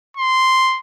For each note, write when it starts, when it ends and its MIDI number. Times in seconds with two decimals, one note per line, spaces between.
0.17 0.79 84